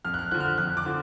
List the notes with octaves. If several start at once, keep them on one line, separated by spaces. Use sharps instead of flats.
F2 F6
F#6
F6
D3 F3 F#6
F6
F#6
F2 F#6
D6
D3 F3